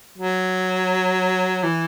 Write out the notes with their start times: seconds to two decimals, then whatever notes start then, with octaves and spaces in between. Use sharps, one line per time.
0.18 F#3
1.63 E3